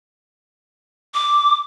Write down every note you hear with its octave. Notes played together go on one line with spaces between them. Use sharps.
D6